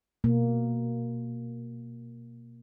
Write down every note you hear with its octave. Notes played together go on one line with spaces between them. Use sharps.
B2 A#3